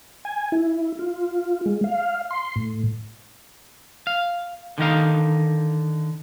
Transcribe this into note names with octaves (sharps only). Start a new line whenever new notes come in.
G#5
E4
F4
G#3
F5
C6
A2
F5
D3 D#3 D#4 F5